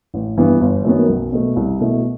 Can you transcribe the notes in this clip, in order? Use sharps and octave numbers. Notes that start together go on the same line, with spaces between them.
A1
G2 E3 B3
G1
F#2 D#3 F#3 B3
B1
B2 A3
C2
B2 A3 E4